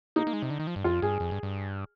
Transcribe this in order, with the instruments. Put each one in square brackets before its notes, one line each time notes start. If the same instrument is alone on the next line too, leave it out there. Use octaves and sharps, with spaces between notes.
[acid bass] A#3 [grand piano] D#4
[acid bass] A#3
G#3
C3
D3
D#3
F3
G2
[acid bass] F2 [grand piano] F4
[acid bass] G2 [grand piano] G#4
[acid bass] F2
G2
G2